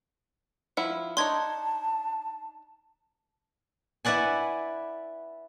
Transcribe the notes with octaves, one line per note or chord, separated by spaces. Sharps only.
F3 E4 F#5
D4 D#4 C#5 A5 C6 G#6
E4 B4 D5 F#5 G#5